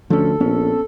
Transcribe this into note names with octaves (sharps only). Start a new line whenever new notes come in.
D2 F3 C#4 A4
A#1 B3 C#4